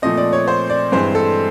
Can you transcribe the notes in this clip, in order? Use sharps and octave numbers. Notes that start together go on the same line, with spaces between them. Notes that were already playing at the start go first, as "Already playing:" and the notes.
A#2 F3 A3 C4 D#5
D5
C#5
C5
D5
G2 E3 G#3 C4 C5
A4